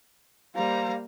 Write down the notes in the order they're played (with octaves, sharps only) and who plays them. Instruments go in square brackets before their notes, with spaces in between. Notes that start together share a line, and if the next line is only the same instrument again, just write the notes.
[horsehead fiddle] G3 A#3 [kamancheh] C5 A#5 [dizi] F5